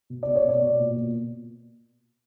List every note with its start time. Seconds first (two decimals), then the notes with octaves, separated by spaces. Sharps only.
0.10 B2
0.23 B2 D5
0.36 C#5
0.44 B2 D5
0.62 B2
0.80 A#2
0.97 A#2